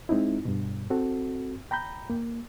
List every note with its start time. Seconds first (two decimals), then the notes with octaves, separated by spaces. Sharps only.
0.09 G#3 C4 D#4 E4
0.45 G2 B2
0.90 C4 F#4 A4
1.71 G5 A#5 B5 G6
2.10 A#3